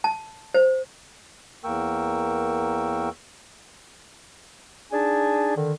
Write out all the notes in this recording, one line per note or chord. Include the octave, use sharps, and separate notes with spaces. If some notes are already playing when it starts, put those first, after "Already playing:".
A5
C5
E2 A#3 A#4 G5 C#6 E6
D4 D#4 G#4 G#5 A5
D3 D#3